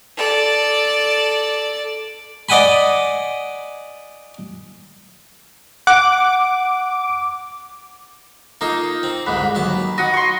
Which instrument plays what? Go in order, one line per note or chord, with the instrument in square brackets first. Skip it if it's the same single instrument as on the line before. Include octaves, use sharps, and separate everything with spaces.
[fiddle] A4 D5
[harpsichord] D5 D#5 F#5 G#5 B5
[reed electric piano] F#5 [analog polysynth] D6
[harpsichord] A#3 F4 A4 [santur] D#4
[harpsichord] C4
[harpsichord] C2 G#2 D3 [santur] B4
[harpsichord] D#2 F#3 A5
[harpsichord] F#4 [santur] D#5 F#5
[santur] C6 C#6